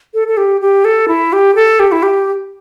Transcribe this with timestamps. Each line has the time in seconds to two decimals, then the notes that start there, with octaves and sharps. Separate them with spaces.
0.14 A4
0.28 A4
0.37 G4
0.61 G4
0.85 A4
1.08 E4
1.33 G4
1.55 A4
1.80 G4
1.92 E4
2.03 G4